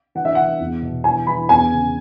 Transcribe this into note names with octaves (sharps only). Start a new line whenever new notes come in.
E3 F#5
E5
E3 F#5
E2
B2
E3 G#5
E3 B5
E2 G#5
C#3